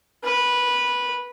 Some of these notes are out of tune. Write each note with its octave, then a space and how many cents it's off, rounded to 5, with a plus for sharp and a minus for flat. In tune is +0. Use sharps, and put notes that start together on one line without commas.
B4 -10